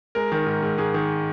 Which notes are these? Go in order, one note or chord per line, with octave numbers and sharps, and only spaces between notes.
G#3 A#4
D#3
G#2
G#2
G#2 G#4
D#3